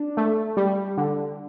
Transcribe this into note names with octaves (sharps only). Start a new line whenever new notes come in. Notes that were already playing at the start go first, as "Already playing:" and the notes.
Already playing: D4
A3
G3
D3